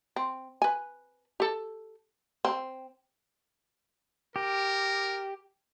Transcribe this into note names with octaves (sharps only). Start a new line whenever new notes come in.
C4
B4 G#5
G4 A4
C4
G4 A#4